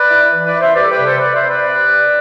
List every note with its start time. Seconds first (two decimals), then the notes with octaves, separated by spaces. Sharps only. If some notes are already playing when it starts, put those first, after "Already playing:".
Already playing: B4 D5
0.09 E4
0.31 E3
0.45 B4 D5
0.53 E4
0.60 C5 E5
0.75 G3 B4 D5
0.83 A4
0.90 G4 B4
0.97 C3
1.05 A4 C5
1.19 C3 B4 D5
1.34 C5 E5
1.42 C3
1.49 B4 D5
1.64 C3
1.85 C3